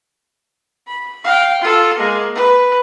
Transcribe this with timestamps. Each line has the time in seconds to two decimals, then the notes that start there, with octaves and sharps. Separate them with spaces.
0.87 B5
1.24 F5 G5
1.61 F4 A4
1.98 G#3 A#3
2.35 B4